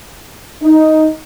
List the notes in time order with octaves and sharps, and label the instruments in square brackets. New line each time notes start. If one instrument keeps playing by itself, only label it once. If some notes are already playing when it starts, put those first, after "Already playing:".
[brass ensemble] D#4